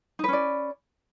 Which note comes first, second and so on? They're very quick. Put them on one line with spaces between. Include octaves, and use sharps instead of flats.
D#4 B4 C#4 D5